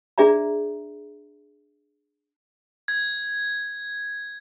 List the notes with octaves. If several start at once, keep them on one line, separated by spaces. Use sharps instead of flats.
D4 G#4 D5 E5 A#5
G#6